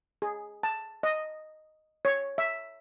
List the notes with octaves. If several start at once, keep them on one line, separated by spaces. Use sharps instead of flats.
G#4
A5
D#5
C#5
E5